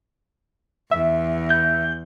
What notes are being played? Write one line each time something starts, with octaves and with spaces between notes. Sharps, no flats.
E2 E5
G6